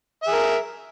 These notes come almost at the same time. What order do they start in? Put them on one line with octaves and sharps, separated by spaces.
E5 G#4 A#4